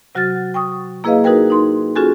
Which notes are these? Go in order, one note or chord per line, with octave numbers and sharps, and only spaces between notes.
C3 F#3 F#4 F#5 F6 A6
G5 C#6 D#6
A#3 E4 G#4 B4 D#5 F5
D#4 F#4 G#4 A#4 B4 G5
D#4 C6
C#4 F4 F#4 G#4 A4 G#5